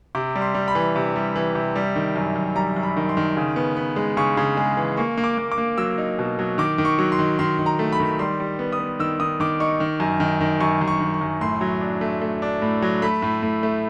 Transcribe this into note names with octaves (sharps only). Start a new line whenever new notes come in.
C3 D6
G3
C6
G3
B5
E3
C3
G3
E3
C3
G3
D#3
F#2
F#2
G3 A#5
F#2
B5
D#3
C6
D#3
C#3
B3
B3
G#3
C#3 C#6
C#3
G#3
E3
A#3 C#6
A#3
D6
A#3
D6
A#3
F#3 E6
D#4
B2
F#3
D#3 D6
D#3
C#6
F#3
C6
D#3
D#3 C6
D#3
A#5
A3
B5
D#3
G3 C6
G3
B3
D#6
B3
D#3 E6
D#3 D#6
D#3 D6
D#4 C#6
D#3
F#2
D#3
D#3
F#2 C#6
F#2
C#6
D#3
C#6
F#2
A2 C6
F#3
D4
A3
A3
D4
A2
F#3
A3 B5
A2
A2
A3